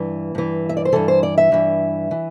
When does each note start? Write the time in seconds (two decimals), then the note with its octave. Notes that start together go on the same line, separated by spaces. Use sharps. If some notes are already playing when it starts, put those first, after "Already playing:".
Already playing: G2 E3
0.35 G2 E3
0.69 E5
0.77 D5
0.85 C5
0.92 G2 E3 A4
1.08 C5
1.23 D5
1.38 E5
1.52 G2 E3
2.11 E3